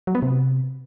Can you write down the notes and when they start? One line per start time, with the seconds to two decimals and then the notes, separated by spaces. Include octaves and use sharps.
0.07 F#3
0.15 B3
0.22 C3